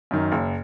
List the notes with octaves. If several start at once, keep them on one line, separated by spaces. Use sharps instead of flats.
F#2 D#3
F#1